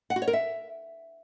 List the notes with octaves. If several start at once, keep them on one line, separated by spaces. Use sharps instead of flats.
F#5
F#4
C#5
A#4
E5